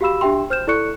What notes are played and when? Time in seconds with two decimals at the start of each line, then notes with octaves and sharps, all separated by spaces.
0.01 F#4 G4 F5 B5 E6 E7
0.21 D4 G4 E5 G5 C6
0.50 C5 F6 G6 E7
0.67 E4 A4 D5 C#6 F#6 C#7